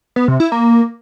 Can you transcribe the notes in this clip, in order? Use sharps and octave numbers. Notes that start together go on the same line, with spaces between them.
B3
C3
E4
A#3